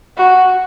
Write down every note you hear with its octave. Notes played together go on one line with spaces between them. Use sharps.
F#4